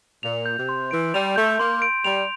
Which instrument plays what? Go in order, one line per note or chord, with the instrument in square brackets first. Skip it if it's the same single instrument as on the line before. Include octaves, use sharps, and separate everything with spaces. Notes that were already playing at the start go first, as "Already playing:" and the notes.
[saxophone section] A#2 [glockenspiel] F7
[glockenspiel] G6
[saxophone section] C3
[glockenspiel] C6
[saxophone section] E3 [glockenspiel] D7
[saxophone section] G3 [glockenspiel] F7
[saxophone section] A3 [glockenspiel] G6
[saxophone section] A#3 [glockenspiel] C6
[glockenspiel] D7
[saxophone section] G3 [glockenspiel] F7